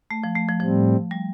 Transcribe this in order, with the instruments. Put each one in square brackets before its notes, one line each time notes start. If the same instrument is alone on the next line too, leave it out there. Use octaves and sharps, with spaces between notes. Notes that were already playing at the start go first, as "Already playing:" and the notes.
[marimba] A3
F3
A3
F3
[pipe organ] A2 G3 C4 [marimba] F3
[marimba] G3